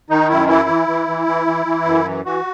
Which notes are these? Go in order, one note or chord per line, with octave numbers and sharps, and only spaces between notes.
D#3 D#4
F#2 E4
E3 E4
E3
E3
E3
E3
E3
E3
F#2
E3
E3 F#4